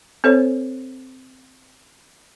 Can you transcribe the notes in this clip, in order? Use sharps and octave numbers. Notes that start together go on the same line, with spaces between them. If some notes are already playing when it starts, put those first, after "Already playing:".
C4 A4 C5 C#5